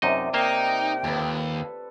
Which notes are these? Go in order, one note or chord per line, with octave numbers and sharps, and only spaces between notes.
F#2 C3 D#4 D5 D#5
A#3 D#4 C5 G5
D#2 A4 B4